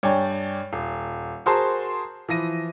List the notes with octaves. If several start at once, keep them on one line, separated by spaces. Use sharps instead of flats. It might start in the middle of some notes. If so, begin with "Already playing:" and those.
G2 C#5 D5 G5 G#5
D#1
F#4 G#4 A#4 C5 A5 C6
E3 F3 A#6 D#7